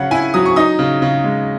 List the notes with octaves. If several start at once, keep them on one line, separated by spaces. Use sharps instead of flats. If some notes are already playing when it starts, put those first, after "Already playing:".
Already playing: C#3 F#3 C#4 F#5
E4 G#5
F#3 D#6
C#6
D#4 D#6
C#3
C#3
G#3